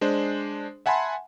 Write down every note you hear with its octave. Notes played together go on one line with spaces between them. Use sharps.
G#3 D4 C5
E5 F#5 G#5 A5 B5 C6